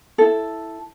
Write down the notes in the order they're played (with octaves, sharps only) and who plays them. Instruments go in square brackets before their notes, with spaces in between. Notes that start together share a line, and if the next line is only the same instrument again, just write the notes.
[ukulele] E4 A4